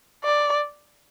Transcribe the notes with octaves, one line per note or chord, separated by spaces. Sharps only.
D5